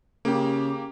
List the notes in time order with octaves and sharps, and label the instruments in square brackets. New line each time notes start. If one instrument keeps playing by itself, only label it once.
[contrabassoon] C#3 [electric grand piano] A#3 G4